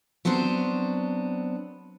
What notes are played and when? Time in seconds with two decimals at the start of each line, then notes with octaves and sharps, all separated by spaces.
0.25 F#3 B3 C4 D4 C5